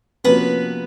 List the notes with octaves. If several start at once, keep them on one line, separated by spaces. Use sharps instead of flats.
C3 F3 A#3 B3 C#4 F#4 B4